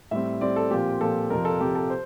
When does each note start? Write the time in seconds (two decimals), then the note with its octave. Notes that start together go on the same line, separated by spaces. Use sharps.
0.11 A2 G3 C4 E5
0.41 A2 G3 C4 D5
0.56 A4
0.71 A#2 F3 C4 G4
1.01 A#2 F3 C4 A4
1.30 F2 C3 F3 A#4
1.45 A4
1.61 F2 C3 F3 G4
1.75 A4
1.90 C5